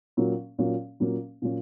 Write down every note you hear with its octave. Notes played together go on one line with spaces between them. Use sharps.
A#2 F#3 A#3 C#4
A#2 F#3 A#3 C#4
A#2 F#3 A#3 C#4
A#2 F#3 A#3 C#4